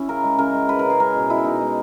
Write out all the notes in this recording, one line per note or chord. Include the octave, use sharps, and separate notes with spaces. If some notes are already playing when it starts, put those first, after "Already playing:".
Already playing: C#4 E4
C#3 A#4
G#3
C#3 A#4
G#3
C#3 B4
A#4
C#3
G#4
G#3 A#4
B2
B2 E4
B2 D#4
G#3